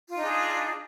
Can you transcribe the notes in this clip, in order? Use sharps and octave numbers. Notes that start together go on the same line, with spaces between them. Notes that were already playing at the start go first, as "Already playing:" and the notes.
D4 D#4 F4 G#4